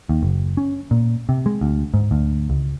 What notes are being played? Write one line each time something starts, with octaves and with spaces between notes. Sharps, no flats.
D#2
F#1
C#4
A#2
C3
G#3
D2
G#2
D2
C#2